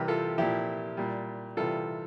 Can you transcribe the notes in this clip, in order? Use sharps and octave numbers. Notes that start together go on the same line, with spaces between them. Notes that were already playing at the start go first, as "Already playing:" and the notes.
Already playing: C3 E3 G3 G4 A#4
F4 A4
A#2 F3 E4 G4
A#2 G3
C3 E3 G3 F4 A4